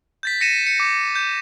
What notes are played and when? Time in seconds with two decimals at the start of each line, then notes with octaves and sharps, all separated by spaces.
0.23 G6 A6 B6
0.41 A#6 C#7 D#7 E7
0.67 C#7
0.80 D6
1.15 G6